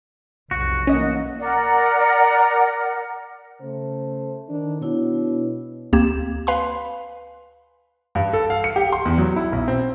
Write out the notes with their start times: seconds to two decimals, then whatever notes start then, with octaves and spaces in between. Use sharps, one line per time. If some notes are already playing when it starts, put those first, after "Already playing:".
0.51 B1 F2 C3 F#4
0.87 E3 A3 A#3 C#4 D#5
1.39 A#4 D5 F#5
3.61 C#3 A3 C5
4.50 D#3 D4
4.82 B2 D4 E4 C#5
5.93 D2 A#3 C4 G4 G#6 E7
6.47 B4 F5 G#5 B5 C6
8.15 G2
8.33 A4
8.50 F5
8.64 C#7
8.76 G4
8.93 C6
9.05 E2
9.18 F#3
9.36 E4
9.52 B1
9.68 C4